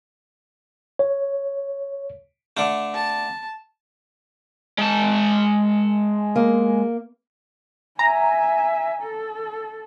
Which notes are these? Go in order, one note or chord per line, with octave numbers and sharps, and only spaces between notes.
C#5
D3 A3
A5
G#3 A5
A#3
E5 G#5 A#5
A4